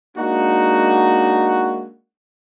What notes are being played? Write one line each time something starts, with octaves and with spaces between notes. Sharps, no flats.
G#3 A#3 D4 D#4 F#4